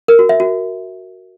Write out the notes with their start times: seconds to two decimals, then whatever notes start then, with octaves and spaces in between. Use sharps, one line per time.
0.08 A#4
0.19 F#4
0.29 E5
0.40 F#4